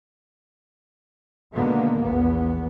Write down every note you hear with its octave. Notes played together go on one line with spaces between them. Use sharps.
B2 D3 D#3 G#3 A#3 B3
A#1 E2 B3